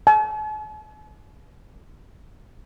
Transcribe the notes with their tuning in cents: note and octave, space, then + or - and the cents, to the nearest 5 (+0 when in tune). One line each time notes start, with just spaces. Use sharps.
A5 -45